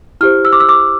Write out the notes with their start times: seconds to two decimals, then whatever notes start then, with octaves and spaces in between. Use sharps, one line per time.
0.21 E4 G4 C5 F6
0.45 E6
0.53 D6
0.60 E6
0.69 D6